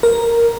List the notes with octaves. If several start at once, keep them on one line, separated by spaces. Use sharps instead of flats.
A#4